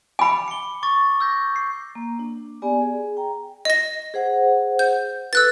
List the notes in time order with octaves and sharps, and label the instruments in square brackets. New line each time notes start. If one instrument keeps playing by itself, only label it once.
[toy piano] G#5 B5 [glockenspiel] D6 C#7
[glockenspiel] C#7 G7
C#6 D6 A6
E6 G6 A#6
C7
[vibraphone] A#3
D4
B3 G4 D5 G#5
G#4
G5 A#5
[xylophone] D#5 A#6
[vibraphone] G#4 C5 F#5
[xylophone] G6
[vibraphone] A4 B4 [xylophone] E6 F#6 A6